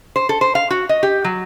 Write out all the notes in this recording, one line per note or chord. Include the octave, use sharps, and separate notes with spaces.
C5
A4
C5
F5
F#4
D#5
G4
F#3